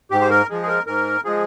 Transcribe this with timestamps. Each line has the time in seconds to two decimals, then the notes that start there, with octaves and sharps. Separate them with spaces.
0.11 G#2 G4
0.21 C5
0.30 A#4
0.49 F3 G#3
0.62 G#4
0.68 A#4
0.87 G#2 A#4
1.24 F3 G#3 G#4